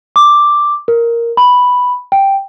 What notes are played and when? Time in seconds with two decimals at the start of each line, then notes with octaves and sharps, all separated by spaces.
0.16 D6
0.88 A#4
1.37 B5
2.12 G5